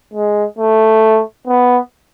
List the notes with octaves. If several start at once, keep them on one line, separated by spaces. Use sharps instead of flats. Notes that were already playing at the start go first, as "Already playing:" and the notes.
G#3
A3
B3